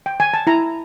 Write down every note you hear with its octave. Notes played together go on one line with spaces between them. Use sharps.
G5
G#5
A5
E4 A#5